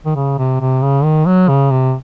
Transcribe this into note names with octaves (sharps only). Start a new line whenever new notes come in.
D#3
C#3
C3
C3
C#3
D#3
F#3
C#3
C3